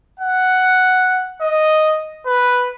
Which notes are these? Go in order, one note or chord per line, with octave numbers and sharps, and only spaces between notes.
F#5
D#5
B4